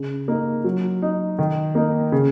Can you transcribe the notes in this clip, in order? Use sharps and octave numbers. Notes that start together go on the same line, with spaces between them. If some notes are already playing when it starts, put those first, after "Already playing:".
Already playing: C#3
A#3 D#4
F#3
D#4
D#3
A#3 D#4
C#3